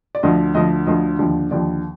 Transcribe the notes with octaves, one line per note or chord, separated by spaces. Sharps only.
D5
D2 D3 F3 D#5
D2 D3 F3 D#5
D2 D3 F3 D#5
D#2 D3 F3
D#2 D3 F3 D5